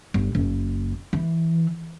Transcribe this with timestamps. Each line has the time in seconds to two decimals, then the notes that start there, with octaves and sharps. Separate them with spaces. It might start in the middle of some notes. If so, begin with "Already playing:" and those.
0.14 G1
0.35 F#1
1.13 E3